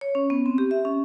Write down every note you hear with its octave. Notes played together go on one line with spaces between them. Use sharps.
C#5
C#4
B3
C4
G4
E5
C#4